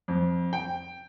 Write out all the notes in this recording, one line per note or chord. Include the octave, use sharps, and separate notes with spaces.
F2
G5